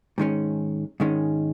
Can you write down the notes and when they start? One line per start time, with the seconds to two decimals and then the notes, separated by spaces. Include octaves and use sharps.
0.18 G#2 D#3 G#3 C#4
1.00 G#2 D#3 G#3 C#4